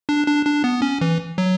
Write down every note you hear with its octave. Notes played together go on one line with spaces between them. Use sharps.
D4
D4
D4
B3
C#4
E3
F#3